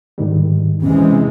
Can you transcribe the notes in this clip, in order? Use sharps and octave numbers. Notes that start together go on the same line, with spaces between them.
G#2 D#3 G3
E2 C3 E3 G#3 C#4